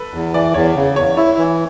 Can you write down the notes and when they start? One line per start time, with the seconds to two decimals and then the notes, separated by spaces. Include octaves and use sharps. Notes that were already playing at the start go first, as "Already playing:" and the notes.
Already playing: A4 B4
0.14 E2
0.34 E3 D5
0.54 E2 C#5
0.75 C#3
0.96 E2 C#5
1.17 E4 C#5
1.38 E3